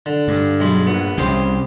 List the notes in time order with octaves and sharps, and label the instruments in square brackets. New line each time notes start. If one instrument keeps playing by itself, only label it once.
[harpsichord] D3
[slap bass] G2
[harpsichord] B1 G#3 B5
A#1 B3
[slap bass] C2 C#3 [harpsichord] G4 C5